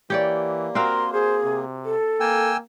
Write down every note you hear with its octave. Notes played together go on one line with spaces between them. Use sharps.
E3 A#3 G4 C#5 D5
C4 F#4 A#4 F5 C6
G#4 C5
C3
A4
A#3 G5 G#5 E6